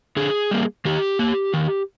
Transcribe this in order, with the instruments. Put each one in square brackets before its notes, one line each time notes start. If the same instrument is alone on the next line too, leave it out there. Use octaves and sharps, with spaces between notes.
[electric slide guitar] D3 G#4
G3 A#3
D#3 G4
A#3
D#3